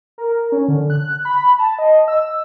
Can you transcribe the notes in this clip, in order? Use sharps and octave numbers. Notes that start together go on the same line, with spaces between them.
A#4
C#4
D3
F#6
B5
A5
D#5
E6